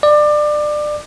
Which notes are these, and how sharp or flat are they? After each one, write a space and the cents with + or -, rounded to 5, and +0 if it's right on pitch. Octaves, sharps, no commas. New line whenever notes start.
D5 +25